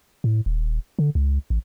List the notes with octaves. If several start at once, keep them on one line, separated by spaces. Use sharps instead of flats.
A2
D#1
D3
C#2
A1